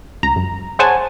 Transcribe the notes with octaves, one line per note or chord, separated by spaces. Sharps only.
C#2 A#5
F#2
G#4 C5 C#5 F#5 G#5 A5